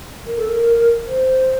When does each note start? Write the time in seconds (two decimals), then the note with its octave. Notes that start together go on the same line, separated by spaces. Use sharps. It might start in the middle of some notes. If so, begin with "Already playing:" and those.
0.26 A#4
0.37 A4
0.49 A#4
1.06 C5